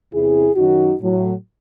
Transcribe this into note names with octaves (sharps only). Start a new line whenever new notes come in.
E2 C3 E3 E4 G#4
F#2 D#3 F#3 D#4 F#4
A2 F#3